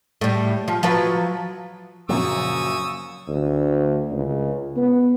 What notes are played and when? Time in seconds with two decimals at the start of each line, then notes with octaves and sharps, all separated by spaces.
0.21 A2 G3
0.68 F3
0.83 F3 F#3 B4
2.09 F#2 A#2 C#3 F3 F#3 C#6 D#6 E6
3.27 D2
4.12 C#2
4.76 B3